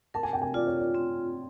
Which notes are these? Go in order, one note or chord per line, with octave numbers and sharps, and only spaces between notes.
A#4 A5
G#5
G5
G#5
F4 D5
C#5
D5
C4